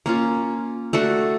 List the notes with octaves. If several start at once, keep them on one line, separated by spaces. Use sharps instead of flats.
A#3 C#4 F4
A3 D4 F#4 A4